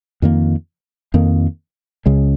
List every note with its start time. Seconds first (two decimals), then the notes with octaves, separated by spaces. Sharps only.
0.22 F2 D#3 A#3
1.14 F2 D#3 A#3
2.06 C#2 C#3 G#3